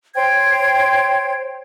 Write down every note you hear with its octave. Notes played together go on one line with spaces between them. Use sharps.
C5 C#5 G5 G#6